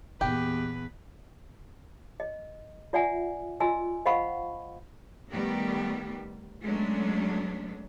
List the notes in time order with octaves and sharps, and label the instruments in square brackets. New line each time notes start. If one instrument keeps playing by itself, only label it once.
[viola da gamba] E2 B4 [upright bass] A#2 [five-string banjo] G4
[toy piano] D#5
F4 D5 E5 F#5 G#5
F4 F#4 D#5 G#5 E6
C5 D#5 F5 F#5 B5 C#6
[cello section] D#3 G3 A3 B3 G4
F#3 G#3 A3 B3 C#4 D4